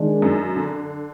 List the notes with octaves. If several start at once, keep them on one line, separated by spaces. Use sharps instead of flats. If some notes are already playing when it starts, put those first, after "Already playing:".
Already playing: D#3 G#3 D4
F#2
D3